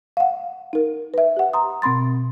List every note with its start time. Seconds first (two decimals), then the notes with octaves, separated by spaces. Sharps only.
0.17 F5 F#5
0.73 D#4 A#4
1.14 B4 E5
1.37 G4 F#5
1.53 A#5 C6 D#6
1.82 B2 C4 B5 C6 A6